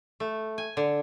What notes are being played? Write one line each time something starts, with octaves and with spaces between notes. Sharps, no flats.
A3
G#5
D3